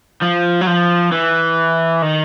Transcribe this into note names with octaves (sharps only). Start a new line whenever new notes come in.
F3
F#3
F3
E3
D#3